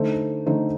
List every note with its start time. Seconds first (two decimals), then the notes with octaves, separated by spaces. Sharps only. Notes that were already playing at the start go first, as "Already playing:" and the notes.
Already playing: D3 A3 D#4 A4 C5
0.46 D3 A3 D#4 A4 C5